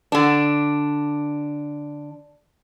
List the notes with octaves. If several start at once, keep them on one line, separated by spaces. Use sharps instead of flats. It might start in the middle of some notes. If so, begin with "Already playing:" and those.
D3 D4